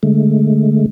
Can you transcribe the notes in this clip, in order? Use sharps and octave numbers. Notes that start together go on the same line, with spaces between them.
D3 G#3 A3